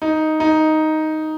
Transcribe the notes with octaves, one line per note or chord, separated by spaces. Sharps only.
D#4
D#4